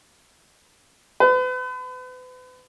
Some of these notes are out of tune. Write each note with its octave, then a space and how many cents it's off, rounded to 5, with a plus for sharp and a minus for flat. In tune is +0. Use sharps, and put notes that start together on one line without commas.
B4 +40